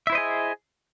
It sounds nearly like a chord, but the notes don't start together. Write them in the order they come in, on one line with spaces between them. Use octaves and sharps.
E5 E4 C5 D#5 G#4